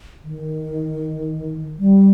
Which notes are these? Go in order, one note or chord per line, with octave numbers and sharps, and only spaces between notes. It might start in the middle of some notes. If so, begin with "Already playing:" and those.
D#3
G3